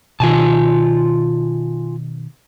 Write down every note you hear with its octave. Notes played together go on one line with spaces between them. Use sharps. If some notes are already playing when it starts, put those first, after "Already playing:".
B2 D#3 F4 G#5 A5